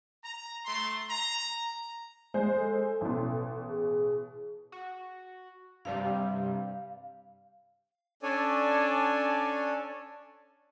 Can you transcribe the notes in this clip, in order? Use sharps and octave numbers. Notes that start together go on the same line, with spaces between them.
A#5
A3 C6
A#5
G#3 C5
A4
A1 B2
G#4
F#4
G2 C3 G3 F5
C#4 D4 A4 C#5 D5 G#5